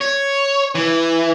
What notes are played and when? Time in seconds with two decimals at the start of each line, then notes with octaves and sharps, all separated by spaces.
0.01 C#5
0.75 E3